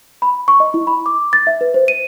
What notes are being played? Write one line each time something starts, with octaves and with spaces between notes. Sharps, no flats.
B5
C#6
D#5
E4
B5
D6
A6
E5
B4
C5
D#7